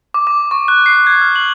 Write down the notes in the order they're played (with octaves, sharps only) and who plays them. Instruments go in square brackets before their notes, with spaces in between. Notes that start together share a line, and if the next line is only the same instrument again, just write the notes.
[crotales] D6
D6
C#6
F#6
C7
G#6
F6
F#7